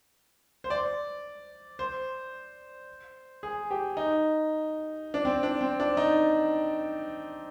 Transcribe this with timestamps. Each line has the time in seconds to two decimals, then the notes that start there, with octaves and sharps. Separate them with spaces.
0.64 C5
0.70 D5
1.79 C5
3.43 G#4
3.71 G4
3.97 D#4
5.14 D4
5.25 C4
5.43 D4
5.61 C4
5.80 D4
5.97 D#4